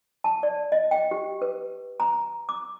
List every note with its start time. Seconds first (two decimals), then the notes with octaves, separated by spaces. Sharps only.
0.24 A5
0.43 D5
0.72 D#5
0.91 G5
1.11 G4
1.42 B4
2.00 A#5
2.49 D6